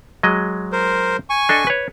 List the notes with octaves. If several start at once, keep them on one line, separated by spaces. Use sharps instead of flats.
F#3 G#3 D#5
A#4 C5
G#5 C#6
D4 A4 D#5
B4 C#5